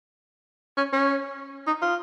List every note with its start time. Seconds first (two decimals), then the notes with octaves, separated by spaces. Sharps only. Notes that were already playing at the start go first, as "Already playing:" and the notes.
0.77 C#4
0.93 C#4
1.67 D#4
1.82 F4